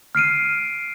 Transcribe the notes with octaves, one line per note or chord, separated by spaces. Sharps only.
F6 C7 D7 D#7